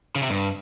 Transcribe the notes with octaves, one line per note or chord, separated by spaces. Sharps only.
C#3
C3
G2